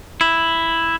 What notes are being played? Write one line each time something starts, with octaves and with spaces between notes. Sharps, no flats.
E4